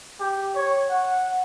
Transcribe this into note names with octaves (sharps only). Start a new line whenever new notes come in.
G4
C#5
F#5